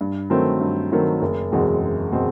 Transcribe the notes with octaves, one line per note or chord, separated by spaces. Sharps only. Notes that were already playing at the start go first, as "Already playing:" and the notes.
G2
D#3 F#3 A3 C4
G2
D#3 F#3 A3 C4
F#1
E2 B2 G#3 C4
F#1
B2 G#3 C4